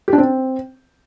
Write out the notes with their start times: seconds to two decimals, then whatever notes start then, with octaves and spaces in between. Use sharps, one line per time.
0.08 G4
0.13 D4
0.18 C4